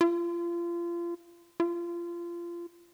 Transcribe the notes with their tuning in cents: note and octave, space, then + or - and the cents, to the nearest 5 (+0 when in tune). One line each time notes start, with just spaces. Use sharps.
F4 -30
F4 -25